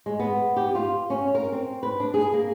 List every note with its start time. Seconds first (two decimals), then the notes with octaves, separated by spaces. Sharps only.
0.06 G#3
0.19 B3
0.56 G4
0.75 F4
1.10 C#4
1.35 A#4
1.52 C4
1.83 B4
2.00 D4
2.14 G#4
2.33 A#3